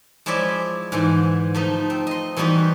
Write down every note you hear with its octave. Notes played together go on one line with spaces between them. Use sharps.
F3 G#3 E4 C#5 D5 E5
G#2 D3 E3 G#3
F3 A3 D#4
C4
D#5 C6
E3 G3 B3 D#4 F#4